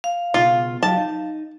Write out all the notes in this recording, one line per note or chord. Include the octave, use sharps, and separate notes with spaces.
F5
C#2 B2 F4
F#3 F4 G4 A5
D#4